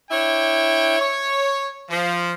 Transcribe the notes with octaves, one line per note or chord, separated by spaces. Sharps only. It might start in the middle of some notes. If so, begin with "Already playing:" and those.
D4 E4 C#5 G5
C#5
F3